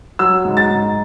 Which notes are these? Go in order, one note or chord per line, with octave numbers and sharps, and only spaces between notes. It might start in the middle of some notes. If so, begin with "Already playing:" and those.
F#3 E6
G#2
A6
G#2